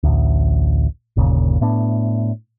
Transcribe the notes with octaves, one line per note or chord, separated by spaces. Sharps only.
A1 D2
G1 D#2 A#2 C#3
A2 A3 B3 D4